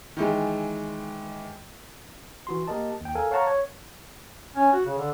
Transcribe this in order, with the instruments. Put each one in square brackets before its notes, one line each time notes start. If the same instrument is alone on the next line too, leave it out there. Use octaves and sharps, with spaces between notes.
[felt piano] D#3 E3 G#3
[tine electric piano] E3 F#4 C6
A#3 G4 A#4 D#5 A5
D#2 G5
A4 A#4 F5 G#5
C#5 F5 F#5 A5 A#5 C#6
C#5
[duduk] C#4
F#4
C#3
D3